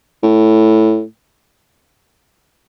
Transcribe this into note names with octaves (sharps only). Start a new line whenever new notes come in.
A2